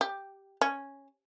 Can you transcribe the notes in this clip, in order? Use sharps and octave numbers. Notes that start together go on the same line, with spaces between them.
G4
C#4